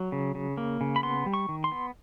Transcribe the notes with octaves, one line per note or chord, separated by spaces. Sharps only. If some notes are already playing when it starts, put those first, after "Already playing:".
Already playing: F#3
C#3
C#3
A#3
C#3
B5
B3 C6
G3
C#6
D#3
C6
B3